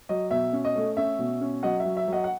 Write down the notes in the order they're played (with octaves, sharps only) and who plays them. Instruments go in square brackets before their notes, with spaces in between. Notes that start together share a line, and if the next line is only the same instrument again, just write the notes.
[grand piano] F#3 D#5
B2 E5
C#4
D#5
A3
C#4 E5
B2
C#4
F#3 D#5 F#5
E5
F#3
E5
F#3 D#5 F#5
F#5